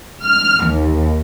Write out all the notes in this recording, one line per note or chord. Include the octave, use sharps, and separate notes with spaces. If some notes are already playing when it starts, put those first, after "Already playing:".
F6
D#2